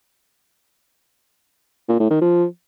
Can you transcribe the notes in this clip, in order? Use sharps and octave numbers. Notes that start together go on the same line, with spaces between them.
A#2
A2
D#3
F3